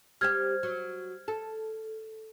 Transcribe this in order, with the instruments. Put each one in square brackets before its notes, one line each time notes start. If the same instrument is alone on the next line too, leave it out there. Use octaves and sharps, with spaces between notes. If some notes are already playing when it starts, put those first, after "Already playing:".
[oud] G3 C4 G4 [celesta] F6 G#6
[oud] F#3
A4